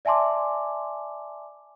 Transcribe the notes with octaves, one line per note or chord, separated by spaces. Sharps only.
D5 E5 G#5 A5 C6 D6